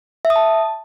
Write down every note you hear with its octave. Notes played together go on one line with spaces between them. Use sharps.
E5
D#6
A5